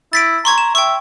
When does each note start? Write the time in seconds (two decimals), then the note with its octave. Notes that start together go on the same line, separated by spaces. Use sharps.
0.13 E4 A6 B6 D7
0.45 A#5 C6 C#6 G#6
0.58 E7
0.75 E5 G5 C#6